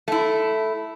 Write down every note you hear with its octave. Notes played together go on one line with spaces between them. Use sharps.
A3 E4